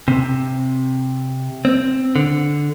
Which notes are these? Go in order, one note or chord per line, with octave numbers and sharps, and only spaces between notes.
C3
C4
D3